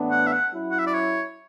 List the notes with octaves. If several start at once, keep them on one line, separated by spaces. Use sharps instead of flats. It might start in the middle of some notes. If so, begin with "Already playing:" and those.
Already playing: A2 E3 B3 D4
F#5
E5
F#5
F#3 C#4 E4
F#5
E5
D5
C#5